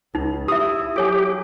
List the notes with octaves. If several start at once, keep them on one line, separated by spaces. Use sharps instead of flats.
C#2 D#4
E4 G4 E5 D#6
F#3 G4 A4 C#5 G#5